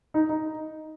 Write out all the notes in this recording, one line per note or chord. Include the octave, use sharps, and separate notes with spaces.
D#4
D#4